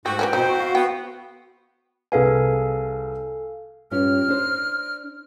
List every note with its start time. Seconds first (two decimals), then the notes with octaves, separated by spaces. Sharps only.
0.06 G#2 A3 F#4 G4 C#6
0.19 E3 A#3 C#4 G5
0.33 F2 B2 D#4 E4 C5
0.47 F#4
0.60 F5
0.75 B3 G5
2.12 C2 G#4 A4 B4 F5 G#5
3.91 G2 C#4 F4 F6
4.28 D4 C5